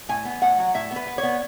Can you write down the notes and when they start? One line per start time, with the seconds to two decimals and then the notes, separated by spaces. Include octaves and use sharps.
0.09 A2 G#5
0.25 B3
0.42 A2 F#5
0.58 F#3
0.74 A2 E5
0.91 B3
0.96 B4
1.07 B3
1.18 C#5
1.23 B3